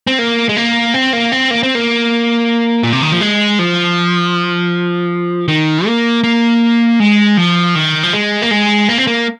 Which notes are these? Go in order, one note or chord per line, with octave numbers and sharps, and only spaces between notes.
C4
A#3
G#3
A#3
C4
A#3
C4
A#3
C4
A#3
A#2
C3
D#3
F3
G#3
F3
D#3
A#3
A#3
G#3
F3
D#3
F3
G#3
A#3
G#3
A#3
C4
A#3